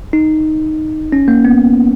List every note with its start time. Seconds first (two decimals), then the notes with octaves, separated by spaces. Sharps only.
0.13 D#4
1.12 C#4
1.28 A#3
1.45 B3